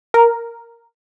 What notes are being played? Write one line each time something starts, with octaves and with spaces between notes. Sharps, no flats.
A#4